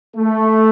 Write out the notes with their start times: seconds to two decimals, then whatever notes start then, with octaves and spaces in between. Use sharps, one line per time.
0.16 A3